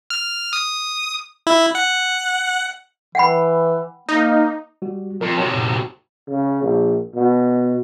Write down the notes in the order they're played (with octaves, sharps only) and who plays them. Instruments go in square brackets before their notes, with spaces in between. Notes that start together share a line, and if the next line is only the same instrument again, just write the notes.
[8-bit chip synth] F6
D#6
E4
F#5
[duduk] E3 [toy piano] F#5 G5 B5
[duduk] A#3 [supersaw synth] D#4
[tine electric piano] G3 F#4 G4
[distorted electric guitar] F2 [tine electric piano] A#4
[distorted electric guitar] C3 F#3 [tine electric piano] C#5 G5 C6
[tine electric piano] F#2 A#2 G5
[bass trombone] C#3
A#1
B2